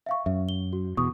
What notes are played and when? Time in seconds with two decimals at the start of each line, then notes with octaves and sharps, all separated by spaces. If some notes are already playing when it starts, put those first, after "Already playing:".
0.06 E5 F5 C#6
0.26 F#2 E5
0.49 G7
0.73 F#4
0.97 E2 B2 C#6 D#6